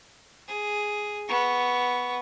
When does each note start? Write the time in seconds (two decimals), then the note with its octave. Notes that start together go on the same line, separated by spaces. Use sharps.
0.48 G#4
1.28 B3 C#6